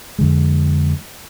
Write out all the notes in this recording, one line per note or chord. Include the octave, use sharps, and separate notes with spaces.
F2 D3 G#3